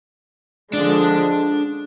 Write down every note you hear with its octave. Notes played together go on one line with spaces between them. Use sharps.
D3 F3 G#3 D4